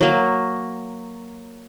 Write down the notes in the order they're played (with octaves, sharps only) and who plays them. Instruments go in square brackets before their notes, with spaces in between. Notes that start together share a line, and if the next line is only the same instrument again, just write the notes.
[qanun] F#3 A#3